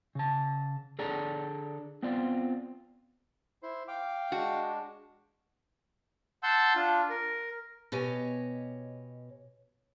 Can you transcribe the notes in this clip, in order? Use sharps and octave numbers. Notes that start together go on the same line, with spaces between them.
C#3 A5
D3 G#4 A4 D5 A#5
B3 C4 F4 D5
E4 C5
F5 G5 D6
G#3 D4 F#4
F#5 A5 C6 E6 G6
D4 F4
A#4
B2 G4 C#5 D#5 G#5